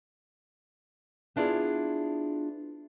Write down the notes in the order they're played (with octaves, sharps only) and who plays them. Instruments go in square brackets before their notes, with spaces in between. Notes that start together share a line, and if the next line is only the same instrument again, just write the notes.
[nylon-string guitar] B3 D4 E4 F4 G#4